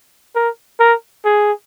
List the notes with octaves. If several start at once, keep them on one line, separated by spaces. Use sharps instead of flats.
A#4
A#4
G#4